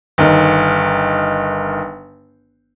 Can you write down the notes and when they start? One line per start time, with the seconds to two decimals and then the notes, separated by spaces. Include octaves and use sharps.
0.18 G1 D#3